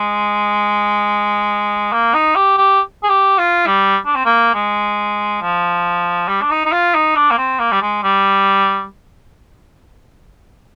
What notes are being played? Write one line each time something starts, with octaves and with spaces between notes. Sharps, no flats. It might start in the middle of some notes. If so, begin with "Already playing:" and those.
Already playing: G#3
A#3
D#4
G4
G4
G#4
G4
F4
G3
D4
C4
A#3
G#3
F3
G3
D4
D#4
D#4
F4
D#4
D4
A#3
C4
A#3
G3
G#3
G3